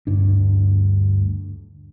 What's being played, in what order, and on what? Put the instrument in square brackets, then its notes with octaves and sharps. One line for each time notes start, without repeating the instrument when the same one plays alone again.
[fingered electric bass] D2 G2 D4